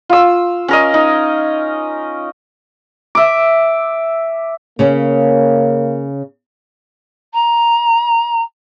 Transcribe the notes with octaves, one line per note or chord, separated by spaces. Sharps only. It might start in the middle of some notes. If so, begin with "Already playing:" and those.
F4 E6
C#4 A#4 D#5
D#4
E5 D6
C#3 A#3 C#4
A#5